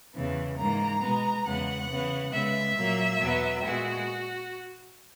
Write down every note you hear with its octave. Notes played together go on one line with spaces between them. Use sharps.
E2 C#3 E3 B3
G#2 E3 A#3 A#5
B2 G#3 B3
E2 C#3 G#3 B3 F#5
C#3 E3 B3
C#3 G#3 B3 E5
A#2 F#3 A#3
E2 B2 F#3 B3
A#2 G#3 B3 F#4